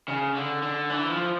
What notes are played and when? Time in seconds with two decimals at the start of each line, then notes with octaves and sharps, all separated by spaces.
0.08 C#3
0.35 D3
0.63 D3
0.90 E3
1.10 F3